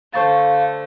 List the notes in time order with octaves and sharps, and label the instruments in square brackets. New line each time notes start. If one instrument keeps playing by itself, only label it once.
[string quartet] D3 A3 [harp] C5 C#6 A6 [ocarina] F5